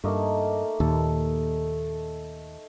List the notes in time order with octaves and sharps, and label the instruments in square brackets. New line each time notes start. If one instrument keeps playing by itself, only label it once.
[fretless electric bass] G2 [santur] A3 A#3 D#4
[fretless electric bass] D#2 A#2 [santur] A4